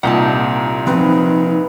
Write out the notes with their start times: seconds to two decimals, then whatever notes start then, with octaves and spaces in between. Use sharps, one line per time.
0.03 C2 A#2 D#4 F#5 G5 A5
0.87 F3 C4 D#4 B4